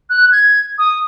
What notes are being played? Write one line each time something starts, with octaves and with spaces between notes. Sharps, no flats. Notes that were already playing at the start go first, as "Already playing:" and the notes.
F#6
G#6
D#6